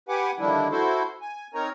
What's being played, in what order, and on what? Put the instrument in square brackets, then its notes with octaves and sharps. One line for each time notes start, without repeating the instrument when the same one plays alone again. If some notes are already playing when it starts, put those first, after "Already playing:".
[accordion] G4 B4 F#5 G#5 D6
D3 D#3 F3 G3 D4 E4
E4 F#4 A4 C5
G#5
C4 D#4 A#4 C#5 A#5